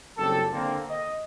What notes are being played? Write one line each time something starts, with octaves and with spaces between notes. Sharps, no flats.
F#1 C2 F2 G4 A4
D3 A#3 C4
D#5